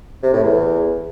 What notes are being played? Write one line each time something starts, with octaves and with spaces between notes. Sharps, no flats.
C3
A2
E2